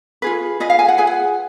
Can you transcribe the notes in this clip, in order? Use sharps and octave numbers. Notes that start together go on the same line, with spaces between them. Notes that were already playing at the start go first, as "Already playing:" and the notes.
F4 G#4 B4
F4 G#4 B4 D#5
F5
G#5
F#5
F4 G#4 B4 G#5
F#5